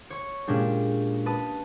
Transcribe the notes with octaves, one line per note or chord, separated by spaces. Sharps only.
C#5 C#6
A#2 G#3 C#4 D4 G4
B4 A5 D#6